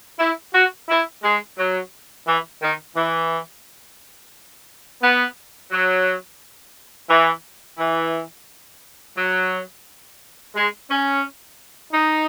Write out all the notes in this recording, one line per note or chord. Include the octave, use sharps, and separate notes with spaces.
E4
F#4
E4
G#3
F#3
E3
D#3
E3
B3
F#3
E3
E3
F#3
G#3
C#4
D#4